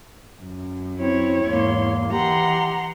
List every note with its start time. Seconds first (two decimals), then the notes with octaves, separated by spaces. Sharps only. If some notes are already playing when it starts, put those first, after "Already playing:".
0.42 F#2
0.99 C4 E4 C#5
1.46 E2 G#2 A#3 C6
2.12 E3 G4 F#5 A#5 C6